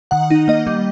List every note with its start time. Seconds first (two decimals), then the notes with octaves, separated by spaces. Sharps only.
0.11 D#3 F#5
0.30 D#4
0.48 A#3 D#5
0.67 G3